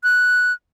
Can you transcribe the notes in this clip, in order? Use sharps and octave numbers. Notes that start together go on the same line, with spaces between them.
F#6